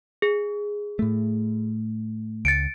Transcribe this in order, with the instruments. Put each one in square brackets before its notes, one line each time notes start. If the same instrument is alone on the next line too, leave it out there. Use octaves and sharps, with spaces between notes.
[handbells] G#4
[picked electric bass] A2 A3
[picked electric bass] C#2 [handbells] A6 C#7 D7